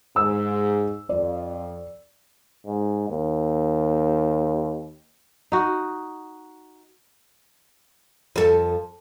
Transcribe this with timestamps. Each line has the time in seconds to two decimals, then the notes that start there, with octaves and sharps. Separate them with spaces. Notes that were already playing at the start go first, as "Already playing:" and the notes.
0.16 G#2 E6
1.09 F2 D5
2.67 G#2
3.09 D#2
5.52 D#4 F#4
8.36 F2 A4